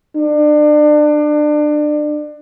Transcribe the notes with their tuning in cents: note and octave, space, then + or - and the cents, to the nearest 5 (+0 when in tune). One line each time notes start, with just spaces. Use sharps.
D4 +30